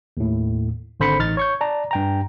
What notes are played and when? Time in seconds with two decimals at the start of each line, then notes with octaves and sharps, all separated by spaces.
0.17 D#2 A2
1.00 G#1 D3 C5 B5 B6 C#7
1.19 A1 D#4 F6 A6
1.37 C#5 C#6 G6
1.61 D5 A5 A#5
1.91 G2 G5 A#5